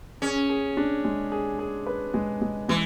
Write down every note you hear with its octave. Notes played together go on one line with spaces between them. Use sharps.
C#4 G#4
G#4
D4
G#3
G#4
G#4
B4
G#3
G#3
E3 G#3